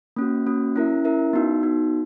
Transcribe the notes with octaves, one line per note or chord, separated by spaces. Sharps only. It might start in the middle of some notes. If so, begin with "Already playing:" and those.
A#3 C#4 F#4
A#3 C#4 F#4
C#4 E4 A#4 E5
C#4 E4 A#4 E5
B3 D#4 F#4
B3 D#4 F#4